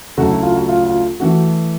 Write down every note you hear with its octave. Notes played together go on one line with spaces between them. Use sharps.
D2 C#3 F#3 A3 F#4
E4
F4
F#4
F4
F4
E3 A3 F#4